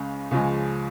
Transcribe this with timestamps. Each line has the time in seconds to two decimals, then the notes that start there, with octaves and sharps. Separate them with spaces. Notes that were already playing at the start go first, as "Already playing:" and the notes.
Already playing: C#2 C#3 G#3 C#4
0.31 C#2 C#3 F3 G#3